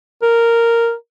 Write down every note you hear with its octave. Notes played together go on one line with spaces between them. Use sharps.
A#4